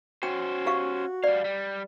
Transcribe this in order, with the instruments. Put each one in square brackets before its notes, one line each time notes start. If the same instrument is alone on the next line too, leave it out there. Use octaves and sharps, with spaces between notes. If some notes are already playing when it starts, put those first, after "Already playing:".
[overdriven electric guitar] C#4 C5 [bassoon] F#4 [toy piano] G5
[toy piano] G4 F5 C#6
[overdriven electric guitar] G3 F5 [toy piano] D5
[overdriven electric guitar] G3